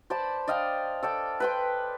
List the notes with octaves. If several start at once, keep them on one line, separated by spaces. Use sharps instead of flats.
C5 D5 A5 B5
D5 D#5 F5 G5
A4 D5 G5
B4 G5 C6